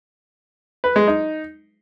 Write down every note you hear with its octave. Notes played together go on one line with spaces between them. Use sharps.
B4
G#3
D#4